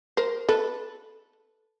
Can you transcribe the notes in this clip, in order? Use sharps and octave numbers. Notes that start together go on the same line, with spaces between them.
A#4 C5
A4 B4